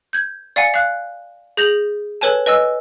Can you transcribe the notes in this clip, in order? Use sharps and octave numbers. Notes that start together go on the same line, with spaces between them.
G6 G#6
D5 F5 F#5 G#5 C#7
F5 F#6
G#4 G6 A#6 F7 F#7
A4 B4 C#5 G#5 A5
B4 D#5 G#5 E6